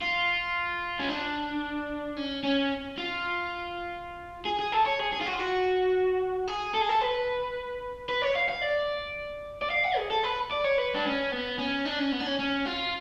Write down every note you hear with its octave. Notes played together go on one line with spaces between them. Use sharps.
F4
C#4
D4
C#4
C#4
F4
G#4
G#4
A4
C#5
G#4
G#4
F4
F#4
F4
F#4
G#4
A4
G#4
A4
B4
B4
C#5
F5
F5
D5
D5
F5
F#5
G#4
A4
B4
D5
C#5
B4
D4
C#4
B3
C#4
D4
C#4
B3
D4
C#4
C#4
F4